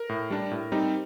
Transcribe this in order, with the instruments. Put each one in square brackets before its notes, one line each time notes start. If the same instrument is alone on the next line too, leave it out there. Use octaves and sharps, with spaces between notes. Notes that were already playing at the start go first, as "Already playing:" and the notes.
Already playing: [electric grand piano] A#4
A2
G3 D4
A2
G3 C4 D#4